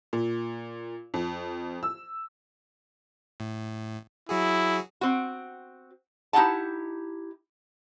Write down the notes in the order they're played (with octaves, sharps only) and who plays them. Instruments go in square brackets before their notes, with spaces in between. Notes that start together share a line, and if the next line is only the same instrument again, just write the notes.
[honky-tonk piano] A#2
F2
E6
[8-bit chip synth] A2
[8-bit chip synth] F#3 F#4 G#4 [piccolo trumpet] E4
[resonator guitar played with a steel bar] C4 F#4
D#4 E4 G4 F#5 A5